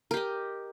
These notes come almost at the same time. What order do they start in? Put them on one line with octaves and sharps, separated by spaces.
A#4 G4 D#5